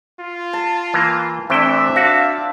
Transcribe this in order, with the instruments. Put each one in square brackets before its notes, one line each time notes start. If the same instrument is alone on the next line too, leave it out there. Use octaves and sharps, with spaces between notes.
[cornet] F4
[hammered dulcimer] A5
[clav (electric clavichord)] E3 A#3
[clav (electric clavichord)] E3 E4 G5 [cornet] A3 [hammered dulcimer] C4 D4 [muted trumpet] E5
[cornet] D4 [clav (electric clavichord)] F#4 [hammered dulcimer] F5